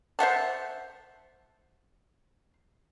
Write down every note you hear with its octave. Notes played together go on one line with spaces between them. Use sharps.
C5 E5 F#5 A5